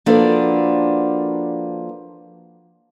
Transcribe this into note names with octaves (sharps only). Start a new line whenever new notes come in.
F3 A#3 D4 F#4 A4 B4